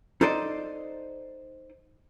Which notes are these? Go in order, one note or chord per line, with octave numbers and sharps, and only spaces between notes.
D#4 A4 C5 D5 D#5